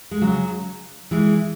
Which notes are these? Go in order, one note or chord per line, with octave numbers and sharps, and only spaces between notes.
G#3
C#3 F#3
E3 G#3